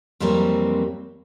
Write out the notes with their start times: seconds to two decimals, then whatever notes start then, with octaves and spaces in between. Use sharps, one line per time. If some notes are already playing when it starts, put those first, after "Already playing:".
0.20 F2 E3 F#3 G3 A#3 C4